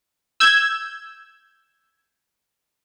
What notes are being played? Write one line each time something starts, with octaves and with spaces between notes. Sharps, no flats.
E6 G6 G#6